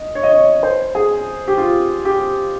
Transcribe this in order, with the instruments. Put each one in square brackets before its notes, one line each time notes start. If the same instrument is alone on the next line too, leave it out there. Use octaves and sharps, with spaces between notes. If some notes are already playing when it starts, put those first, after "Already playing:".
Already playing: [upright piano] D#5
C#5
D#5
C#5
C5
G#4
G4
F4
G4